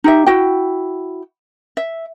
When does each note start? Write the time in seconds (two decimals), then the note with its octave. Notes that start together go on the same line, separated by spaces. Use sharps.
0.04 D#4 G4 E5
0.26 E4 F#4 G5
1.77 E5